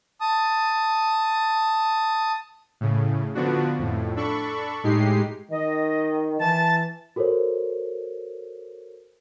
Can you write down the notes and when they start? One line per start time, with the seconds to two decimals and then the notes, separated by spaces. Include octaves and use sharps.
0.21 A5 D#6
2.81 A2 C#3
3.35 D3 F3 B3 D4 F#4
3.79 F2 A2
4.16 D4 A4 B5 C#6
4.84 A2 G#3 D#4 G4 C7
5.51 D#3 D#5
6.40 E3 E4 A5
7.16 F#4 A4 A#4 C5 C#5